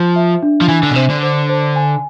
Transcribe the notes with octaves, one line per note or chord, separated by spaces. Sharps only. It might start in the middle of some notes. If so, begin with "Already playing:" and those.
Already playing: F3 C5
E5
D4
F3
E3 G#5
D3
B2
C3 C5
D3
C5
C5
G#5